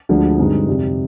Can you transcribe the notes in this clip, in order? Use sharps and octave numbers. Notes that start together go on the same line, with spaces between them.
D2 D3 F3 G#3
G2 D3 G#3 C4 D#4
F2 C3 G3